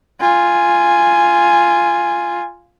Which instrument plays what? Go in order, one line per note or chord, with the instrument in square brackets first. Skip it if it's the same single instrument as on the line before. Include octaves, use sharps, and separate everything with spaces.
[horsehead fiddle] F4 G#5